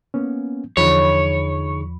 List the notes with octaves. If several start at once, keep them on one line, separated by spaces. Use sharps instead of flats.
A#3 B3 C#4
E2 D3 F3 D#4 G#4 C#5 B5